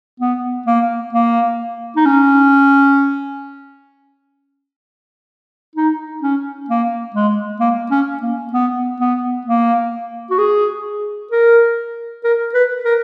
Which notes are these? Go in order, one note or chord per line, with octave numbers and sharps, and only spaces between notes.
B3
A#3
A#3
D#4
C#4
D#4
C#4
A#3
G#3
A#3
C#4
A#3
B3
B3
A#3
F#4
G#4
A#4
A#4
B4
A#4